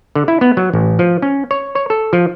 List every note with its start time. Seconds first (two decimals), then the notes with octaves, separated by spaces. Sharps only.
0.16 D3
0.28 E4
0.41 B3
0.57 F#3
0.74 A1
0.99 F3
1.22 C#4
1.51 C#5
1.75 C#5
1.90 A4
2.13 F3